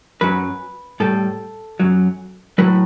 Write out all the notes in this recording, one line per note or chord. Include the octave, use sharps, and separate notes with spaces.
F#2 F#3 B4
A2 G3 A4
F#2 F#3
A2 F#3 B4